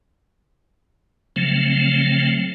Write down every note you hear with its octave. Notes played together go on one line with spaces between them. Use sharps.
C#3 F3 F#3 A3 C4